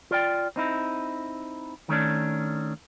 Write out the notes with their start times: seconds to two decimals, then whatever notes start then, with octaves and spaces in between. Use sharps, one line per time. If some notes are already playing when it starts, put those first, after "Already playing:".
0.11 F4 D5 G5
0.56 C4 D#4 E4
1.89 D#3 A3 C#4 D4